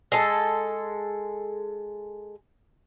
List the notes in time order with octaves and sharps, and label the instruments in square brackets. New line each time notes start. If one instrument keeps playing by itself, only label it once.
[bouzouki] G#3 A4